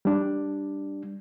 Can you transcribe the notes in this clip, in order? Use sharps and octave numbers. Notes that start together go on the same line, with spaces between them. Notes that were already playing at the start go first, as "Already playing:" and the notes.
G3 D4